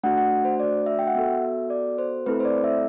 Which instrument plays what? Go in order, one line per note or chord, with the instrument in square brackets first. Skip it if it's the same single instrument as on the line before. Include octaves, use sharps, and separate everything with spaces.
[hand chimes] A3 D4 F#4 F#5
F#5
C5
D5
E5
G5
F#5
B3 F#4 A4 E5
D5
C5
A3 C4 E4 A4 B4
C5
D5
E5